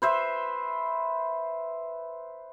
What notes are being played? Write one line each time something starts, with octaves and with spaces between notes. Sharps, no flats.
B4 C5 E5